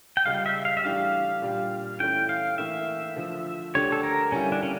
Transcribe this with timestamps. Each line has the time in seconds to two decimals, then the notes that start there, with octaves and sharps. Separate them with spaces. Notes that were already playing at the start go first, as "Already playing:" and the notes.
0.17 G5
0.26 C#2 C#3 G3 F5
0.46 E5
0.65 F5
0.77 E5
0.84 A2 E3 G3 D4 G4 F5
1.42 A#2 G3 D4 G4
2.00 E3 A3 C#4 E4 G5
2.29 F5
2.58 A2 E3 A#3 E4 E5
3.16 D3 F3 A3
3.74 D2 D3 A3 D4 G4 C#5
3.92 A4
4.03 A#4
4.32 D3 G3 A#3 C#4 E4
4.52 D4
4.63 C#4